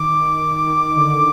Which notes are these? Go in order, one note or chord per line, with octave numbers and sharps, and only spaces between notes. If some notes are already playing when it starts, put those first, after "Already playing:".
Already playing: D#3 D6
D#3
D3